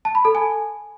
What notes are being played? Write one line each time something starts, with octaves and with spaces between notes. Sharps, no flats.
A5
B5
A4
G#5